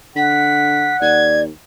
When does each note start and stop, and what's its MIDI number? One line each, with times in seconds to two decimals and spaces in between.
0.16 0.94 50
0.16 1.35 78
0.16 0.96 95
1.01 1.48 39
1.01 1.43 74
1.01 1.40 92